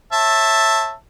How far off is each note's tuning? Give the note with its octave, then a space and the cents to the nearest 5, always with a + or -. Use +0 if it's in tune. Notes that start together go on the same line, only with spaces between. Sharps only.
C#5 -30 E5 +0 A5 +10